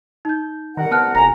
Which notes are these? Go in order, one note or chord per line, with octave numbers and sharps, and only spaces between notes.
D#4 G6
C2 D#3 A#4 F#5
B3 A5 F6 F#6
F1 G#5 A#5 A#6